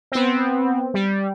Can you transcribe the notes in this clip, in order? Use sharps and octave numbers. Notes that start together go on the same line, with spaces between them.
B3 C4
G3